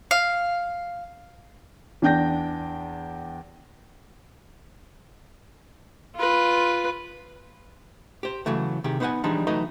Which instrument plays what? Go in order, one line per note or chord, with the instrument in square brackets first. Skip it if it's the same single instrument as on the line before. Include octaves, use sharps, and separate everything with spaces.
[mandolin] F5
[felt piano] E2 D4 G5 G6 A#6
[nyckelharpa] F4 B4
[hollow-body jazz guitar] G4 C5
C#3 E3 F#3 A3
C3 D#3 G4 G#4
B3 D#4 B4 C5 F#5 G#5
E3 F3 G3 G#3 D4 D#4
E3 F#3 A3 D#4 B4 D#5